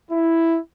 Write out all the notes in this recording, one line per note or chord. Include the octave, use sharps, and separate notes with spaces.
E4